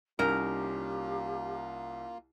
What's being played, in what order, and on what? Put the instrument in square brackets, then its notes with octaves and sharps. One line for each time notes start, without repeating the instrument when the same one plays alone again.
[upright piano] C2 [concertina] A#3 F4 [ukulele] C#4 D#4 A#4 [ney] G4